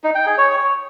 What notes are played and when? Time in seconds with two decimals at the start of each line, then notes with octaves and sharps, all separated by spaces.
0.04 D#4
0.15 G5
0.26 G#4
0.38 C#5